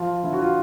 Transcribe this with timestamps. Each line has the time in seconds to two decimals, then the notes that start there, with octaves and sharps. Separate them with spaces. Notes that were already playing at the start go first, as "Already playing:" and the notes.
Already playing: F3 F4
0.23 D3 E4
0.33 F#4
0.41 F4